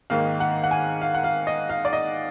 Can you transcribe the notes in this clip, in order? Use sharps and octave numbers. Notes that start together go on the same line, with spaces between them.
G#2 D#3 A#3 D#4 F5
F#5
F#5
G#5
F5
F#5
F5
D#5
F5
D5
D#5